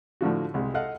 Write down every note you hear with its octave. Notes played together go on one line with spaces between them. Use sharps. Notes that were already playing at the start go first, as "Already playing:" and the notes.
A2 D3 F3 F#4
C2 G#3
A4 D#5 F5 F#5